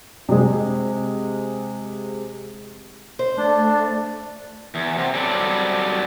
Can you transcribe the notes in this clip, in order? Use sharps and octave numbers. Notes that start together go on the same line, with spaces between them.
C3 G#3
C5
A3 D4 D5
E2
C3
F#3 G3 C4 A4 D5